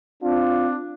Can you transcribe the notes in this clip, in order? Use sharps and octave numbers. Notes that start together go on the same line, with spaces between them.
C4 D4 F4